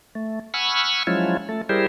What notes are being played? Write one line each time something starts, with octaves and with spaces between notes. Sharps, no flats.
A3
F#5 G#5 B5 C#6 E6 F6
F3 F#3 G#3 C#4 E4 F4
A3 A4
G3 E4 G4 G#4 A#4 C5